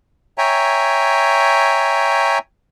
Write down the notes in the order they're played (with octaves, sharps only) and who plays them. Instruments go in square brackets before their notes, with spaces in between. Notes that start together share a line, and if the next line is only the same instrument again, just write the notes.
[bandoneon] C#5 E5 G5 G#5 A#5